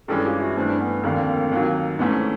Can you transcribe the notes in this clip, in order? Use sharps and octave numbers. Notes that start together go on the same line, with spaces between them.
G2 E3 G#3 C#4 G4 A4
F4 G4
E4 F#4
G2 E3 A3 C4 D4
B3 C#4
F1 D#2 D3 A#3 C4
D#2 D#3 F#3
G#2 E3 A3 B3 C#4
C4